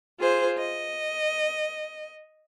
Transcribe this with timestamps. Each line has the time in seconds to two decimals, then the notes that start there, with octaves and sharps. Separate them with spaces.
0.18 F4 G#4 C5
0.58 D#5